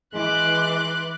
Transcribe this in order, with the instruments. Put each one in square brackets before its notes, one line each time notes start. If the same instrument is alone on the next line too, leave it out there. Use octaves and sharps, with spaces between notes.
[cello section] E3 [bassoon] G#3 [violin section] C6 D6 [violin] F#6